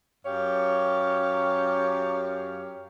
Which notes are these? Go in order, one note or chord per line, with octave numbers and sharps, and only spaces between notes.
F#2 G4 C#5 F5